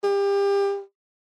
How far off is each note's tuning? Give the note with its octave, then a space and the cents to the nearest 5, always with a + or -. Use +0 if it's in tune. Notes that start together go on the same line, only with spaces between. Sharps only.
G4 +30